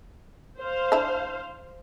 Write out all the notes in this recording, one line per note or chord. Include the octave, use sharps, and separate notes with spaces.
C5 F5
D4 E4